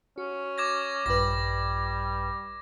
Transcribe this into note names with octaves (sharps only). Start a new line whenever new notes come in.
C#4 F#4
D6 G#6 A#6
A#1 G2 G3 B4 A#6